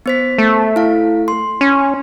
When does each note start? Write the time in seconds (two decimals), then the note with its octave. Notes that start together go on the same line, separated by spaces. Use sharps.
0.06 B3 C5 B6
0.38 A3
0.76 E4 F5
1.28 C6
1.61 C#4